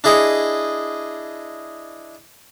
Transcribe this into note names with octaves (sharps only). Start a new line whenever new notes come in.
D4 E4 G#4 D#5